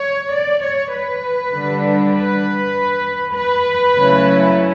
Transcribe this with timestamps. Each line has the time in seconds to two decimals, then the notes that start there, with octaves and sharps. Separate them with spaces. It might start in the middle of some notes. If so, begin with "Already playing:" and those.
Already playing: C#5
0.32 D5
0.63 C#5
0.93 B4
1.53 D3 G3 D4
2.14 B4
3.34 B4
3.95 C#3 F#3 A3 C#4 E4